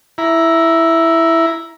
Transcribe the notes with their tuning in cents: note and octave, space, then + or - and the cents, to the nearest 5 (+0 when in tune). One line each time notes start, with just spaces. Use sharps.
E4 +0 A#5 +15